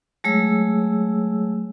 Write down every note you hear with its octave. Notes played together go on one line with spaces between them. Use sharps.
F#3 G#3 A3 G#4 C#5 E6